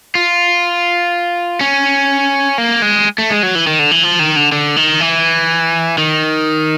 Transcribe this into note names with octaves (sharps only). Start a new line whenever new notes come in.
F4
C#4
A#3
G#3
A3
G#3
F#3
E3
D#3
D3
E3
F3
D#3
D3
D3
D#3
E3
D#3